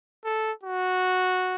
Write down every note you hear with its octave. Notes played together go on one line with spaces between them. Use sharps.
A4
F#4